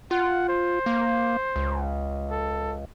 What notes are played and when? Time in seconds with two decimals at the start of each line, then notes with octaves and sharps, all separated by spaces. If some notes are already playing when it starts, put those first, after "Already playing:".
0.11 F4 F#5
0.49 C5
0.86 A#3
1.56 C#2
2.31 A4